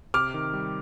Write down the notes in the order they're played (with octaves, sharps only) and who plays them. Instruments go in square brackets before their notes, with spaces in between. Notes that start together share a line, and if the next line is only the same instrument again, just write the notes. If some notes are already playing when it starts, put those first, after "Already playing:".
[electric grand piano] C3 [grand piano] D6 F6
[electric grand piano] D#3
G3